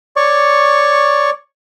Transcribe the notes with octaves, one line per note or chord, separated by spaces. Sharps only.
C#5 D5 C#6